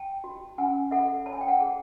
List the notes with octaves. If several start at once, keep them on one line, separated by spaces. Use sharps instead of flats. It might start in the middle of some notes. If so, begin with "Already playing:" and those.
Already playing: G5 A5
F#4
C#4 F#5 G#5
A4 E5 F#5
C#5 A5
G#5
G5
F#5 G#5
G#4